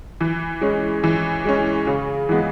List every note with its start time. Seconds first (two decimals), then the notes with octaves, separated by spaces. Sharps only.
0.21 E3
0.61 G#3 C#4
1.04 E3
1.45 G#3 C#4
1.87 C#3
2.29 E3 G#3 B3